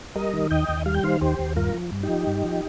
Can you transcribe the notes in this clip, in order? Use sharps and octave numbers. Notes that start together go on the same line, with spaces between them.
G3 A#4 D#5
D#3
D#2 D#5 G5
D#2
G3 F5
G5
D#3 C5 F5
D#2 G4 C5
D#2
G2 F4 A#4
F3
G2
D#4 G4
F3
G2
F3